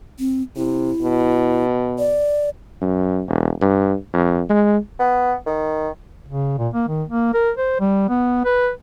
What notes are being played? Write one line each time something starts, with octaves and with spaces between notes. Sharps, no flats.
C4
C3 E4
B2
D5
F#2
E1
G2
F2
G#3
B3
D#3
C#3
A#2
A#3
D#3
A#3
A#4
C5
G3
B3
B4